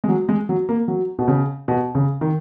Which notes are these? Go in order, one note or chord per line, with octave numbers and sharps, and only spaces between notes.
G#3
F#3
G#3
F#3
A#3
F#3
B2
C#3
B2
C#3
D#3